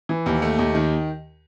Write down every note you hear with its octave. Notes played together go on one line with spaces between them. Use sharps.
E3
D#2
A3
D#2
D#3